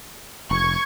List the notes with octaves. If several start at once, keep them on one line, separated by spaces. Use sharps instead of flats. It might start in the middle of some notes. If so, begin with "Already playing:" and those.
F1 C#6 G#6